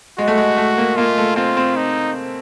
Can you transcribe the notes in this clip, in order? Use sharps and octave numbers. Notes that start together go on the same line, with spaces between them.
G#3 F#4
A3
G#3
A3
A#3
A#3 F4
A3
C4 F4
C4
D#4